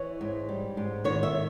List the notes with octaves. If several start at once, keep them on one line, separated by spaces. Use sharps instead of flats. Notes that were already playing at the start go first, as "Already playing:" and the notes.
Already playing: E3 C#5
G#2
G3
G#2
D#3 C#5
E5